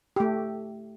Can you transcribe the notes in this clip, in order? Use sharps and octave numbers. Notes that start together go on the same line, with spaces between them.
A3 G4